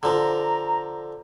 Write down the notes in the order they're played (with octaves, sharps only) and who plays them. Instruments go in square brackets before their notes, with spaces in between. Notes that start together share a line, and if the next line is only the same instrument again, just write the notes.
[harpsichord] D3 F3 [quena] A#5